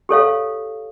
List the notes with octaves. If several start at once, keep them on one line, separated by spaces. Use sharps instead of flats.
G4 A4 C#5 F5